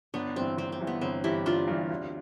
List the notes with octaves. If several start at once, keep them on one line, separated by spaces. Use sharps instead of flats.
G1 B3 D4
G2 E3 C4
G1 C4
C4
G2 E3
B3
G1 C4
G2 E3 E4 G4
G1 D4 F4
G2 E3
D2